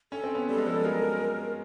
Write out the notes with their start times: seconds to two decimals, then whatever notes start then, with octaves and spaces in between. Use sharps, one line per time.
0.12 C#4 A4
0.24 C4
0.34 B3 C#4
0.48 G3 A4
0.58 G#3
0.67 F3 G3
0.84 F#3 G#3 A#4